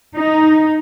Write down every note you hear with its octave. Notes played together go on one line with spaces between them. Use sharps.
D#4